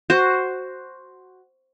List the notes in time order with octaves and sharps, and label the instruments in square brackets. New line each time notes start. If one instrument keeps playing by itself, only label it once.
[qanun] F#4 C5